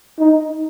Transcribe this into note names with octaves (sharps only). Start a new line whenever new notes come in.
D#4